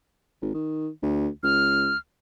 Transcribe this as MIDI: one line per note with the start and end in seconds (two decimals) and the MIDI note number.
0.42 0.50 32
0.54 0.89 51
1.02 1.28 38
1.43 1.92 37
1.43 1.97 89